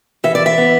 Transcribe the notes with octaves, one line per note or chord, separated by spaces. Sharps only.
E3 E5
D5
E5
B3